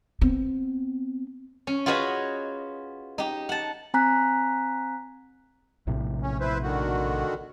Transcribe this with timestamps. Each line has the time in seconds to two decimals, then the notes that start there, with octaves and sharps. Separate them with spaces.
0.21 B3 C4
1.67 C#4
1.86 F4 F#4 G#4 B4 D#5
3.18 D#4 G4
3.49 F#5 A5
3.94 C4 G#5 A#5 F#6 B6
5.87 A#1 A2 C3
6.23 C#4
6.40 E4 B4 C5
6.63 D3 D#3 F#4